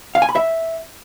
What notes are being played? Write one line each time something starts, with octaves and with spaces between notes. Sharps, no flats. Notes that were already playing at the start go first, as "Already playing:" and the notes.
F5
G#5
B5
E5